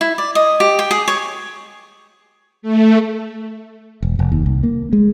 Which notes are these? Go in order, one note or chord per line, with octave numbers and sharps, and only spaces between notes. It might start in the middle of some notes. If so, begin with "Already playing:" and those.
E4
D5
D#5
G4
G5
G#4
C#5
A3
E1
F1
D#2
C2
A#3
G#3